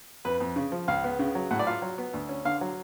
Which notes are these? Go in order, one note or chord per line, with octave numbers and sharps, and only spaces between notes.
F2 B4
F2
C#3
F3
C#2 F5
B3
C#3
F#3
A2 F#5
D5
F4 F5
F#3
B3
D2
C#4
D3 F5
F#3